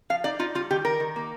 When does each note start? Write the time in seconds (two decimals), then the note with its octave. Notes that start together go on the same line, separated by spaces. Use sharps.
0.10 F3 F5
0.24 D#4 D5
0.39 D#4 F4
0.55 G3 F4
0.71 D#3 G4
0.85 D#3 A#4
1.00 D#3
1.16 A#3